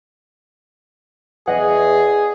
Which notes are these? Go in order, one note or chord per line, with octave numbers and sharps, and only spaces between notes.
E2 G#4 D#5 F#5